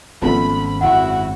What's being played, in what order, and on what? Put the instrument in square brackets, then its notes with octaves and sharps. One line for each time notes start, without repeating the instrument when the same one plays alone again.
[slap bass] G#1 D#3 C#4 [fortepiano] F3 A3 B3 [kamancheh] B5
[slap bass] G#1 F#2 [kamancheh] E4 F#4 [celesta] F#5